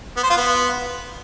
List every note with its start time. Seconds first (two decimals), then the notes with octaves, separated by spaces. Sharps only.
0.17 B3
0.24 C5
0.30 F4
0.37 B3